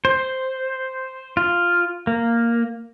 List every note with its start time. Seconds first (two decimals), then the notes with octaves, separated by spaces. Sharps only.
0.05 C5
1.37 F4
2.07 A#3